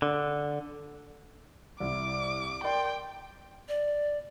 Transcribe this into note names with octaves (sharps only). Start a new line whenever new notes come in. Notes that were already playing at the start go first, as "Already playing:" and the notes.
D3
C2 E4 D6
A#4 D5 G5 C6
D5